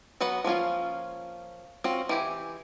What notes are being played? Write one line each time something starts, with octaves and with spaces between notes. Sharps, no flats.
F#3 B3 B4 F#5
F3 A#3 C#4 F4
C4 C#4 F4 F#4
E3 G4 G#5